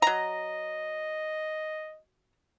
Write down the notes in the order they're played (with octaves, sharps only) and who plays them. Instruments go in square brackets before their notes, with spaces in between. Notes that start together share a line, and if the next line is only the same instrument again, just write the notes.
[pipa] F#3 A#5 [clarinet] D#5